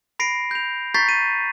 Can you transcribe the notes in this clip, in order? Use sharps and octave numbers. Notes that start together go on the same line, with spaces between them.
B5 A#6 C7 D7
G6 F7
A#5 C#6 G6 A6 B6 C7
D#7